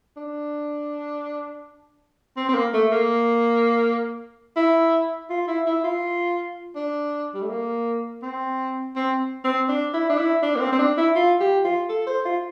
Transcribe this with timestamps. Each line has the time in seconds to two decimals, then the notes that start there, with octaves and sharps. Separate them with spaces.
0.17 D4
2.37 C4
2.49 C4
2.55 A#3
2.74 A3
2.92 A#3
4.56 E4
5.30 F4
5.48 E4
5.66 E4
5.84 F4
6.76 D4
7.34 G3
7.42 A3
7.50 A#3
8.22 C4
8.96 C4
9.44 C4
9.69 D4
9.94 E4
10.10 D4
10.18 E4
10.43 D4
10.56 A#3
10.60 C4
10.73 C4
10.79 D4
10.97 E4
11.15 F4
11.40 G4
11.65 F4
11.89 A4
12.07 C5
12.25 F4